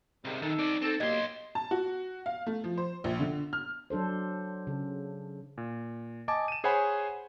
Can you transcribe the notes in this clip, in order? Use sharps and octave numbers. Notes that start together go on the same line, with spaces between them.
G#2 C3 D#3 G3
D#3 D#4 A4
C4 D5
C4 D#4 A4
B1 A#2 F#3 A#3 G4 D#5 C6 G#6
A5
F#4
F5
A3
F3
C5
A#1
D3
F6
F#3 D4 A4 C5
C#3
A#2
D#5 G#5 A5 D6
D#7 E7
G#4 C5 C#5 F#5 G#5 B5